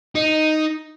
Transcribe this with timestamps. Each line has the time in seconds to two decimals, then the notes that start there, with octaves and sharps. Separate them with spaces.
0.15 D#4